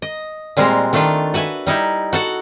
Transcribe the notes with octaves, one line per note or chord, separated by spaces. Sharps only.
D#5
A#2 G3 G#3 C4 A#4
D#3 A3 D4 F4
F#4 B4 E5 G#5
G3 D#4 E4
F#4 A4 F#5